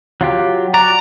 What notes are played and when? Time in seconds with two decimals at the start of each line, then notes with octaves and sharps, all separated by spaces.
0.21 F#3 F4 G4
0.74 F#4 D5 A#5